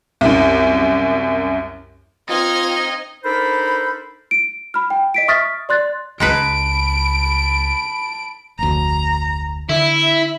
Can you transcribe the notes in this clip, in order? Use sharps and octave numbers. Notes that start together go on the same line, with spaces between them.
C2 F#2
C4 D#4 F4 D#5 F6 G#6
D4 D#4 A4 A#4 C5 B5
D7
B5 F6
G5
D#5 B6 D7
E5 C#6 D#6 F6 A6 B6
D5 C6 F#6 A6
C#2 G#3 D#4 B4 A5 B5 D7
F1 D2 A#5
D3 E4 E5